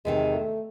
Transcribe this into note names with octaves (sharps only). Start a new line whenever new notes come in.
E2 C3 D#3 G#3
A3